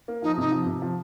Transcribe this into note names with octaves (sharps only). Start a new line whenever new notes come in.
A#3
F3 D#4
C3 D#4
F3
C3
F3